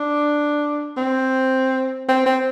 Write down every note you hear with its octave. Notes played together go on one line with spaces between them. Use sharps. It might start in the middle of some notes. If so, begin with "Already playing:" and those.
Already playing: D4
C4
C4
C4